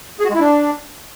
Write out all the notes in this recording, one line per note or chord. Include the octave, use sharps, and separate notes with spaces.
G#4
F#4
G#3
E4
D4